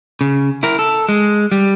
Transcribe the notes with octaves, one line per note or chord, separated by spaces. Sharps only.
C#3
E4 A#4
A4
G#3
G3